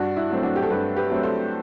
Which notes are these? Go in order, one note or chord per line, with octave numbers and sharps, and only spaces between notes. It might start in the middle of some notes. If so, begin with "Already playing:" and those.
Already playing: G2 D4 F#4
E4
F#3 A3 C4
D4 F#4
G4
A4
G2 G4 B4
G4 B4
F#3 A3 C4
A4 C5